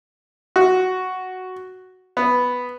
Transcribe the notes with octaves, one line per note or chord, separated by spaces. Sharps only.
F#4
B3